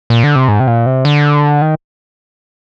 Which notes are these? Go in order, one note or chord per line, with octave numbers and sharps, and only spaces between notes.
A#2
D3
C3
G#2
C3
A#2
C3
D3
D#3